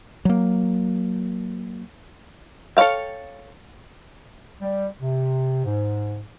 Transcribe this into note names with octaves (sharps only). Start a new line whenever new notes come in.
F#3 A#3
A4 C#5 D5 F5 G5
G3
C3
G#2